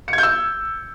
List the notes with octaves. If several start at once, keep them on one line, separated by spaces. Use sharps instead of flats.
C#7
G#6
G6
E6